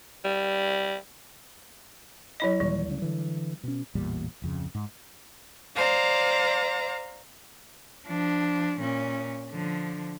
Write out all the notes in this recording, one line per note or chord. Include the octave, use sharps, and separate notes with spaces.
G3
F#3 E4 D#5
D#2 A#2 E3 G3
D2 C#3
D3 E3
B2 C#4
A1 E2 A#2 G3
D1 F2 C#3
G#2
C5 D5 F5 A#5
F3 D4
A#2 C#4
D3 F3